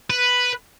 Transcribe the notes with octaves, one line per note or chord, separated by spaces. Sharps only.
B4